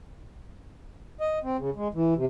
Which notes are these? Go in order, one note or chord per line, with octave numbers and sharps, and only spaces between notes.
D#5
C4
C#3
G#3
E3
C3